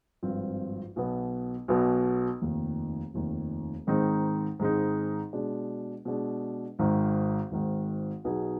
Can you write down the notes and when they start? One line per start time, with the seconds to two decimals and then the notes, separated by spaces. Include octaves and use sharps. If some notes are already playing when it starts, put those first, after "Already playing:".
0.23 G#1 G2 F3 C4 F4
0.96 B1 B2 B3
1.68 B1 B2 B3
2.42 F1 D#2 D#3
3.14 F1 D#2 D#3
3.87 G#2 D#3 G#3 C4 D#4
4.59 G#2 D#3 G#3 C4 D#4
5.33 B2 G#3 D4
6.05 B2 G#3 D4
6.79 G#1 G#2 D#3
7.51 G#1 G#2 D#3
8.24 B1 B2 B3 D#4 G#4